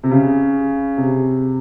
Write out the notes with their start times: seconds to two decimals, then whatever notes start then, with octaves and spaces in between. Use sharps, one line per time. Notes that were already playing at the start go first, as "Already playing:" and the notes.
0.04 C3
0.11 C#3
0.98 C3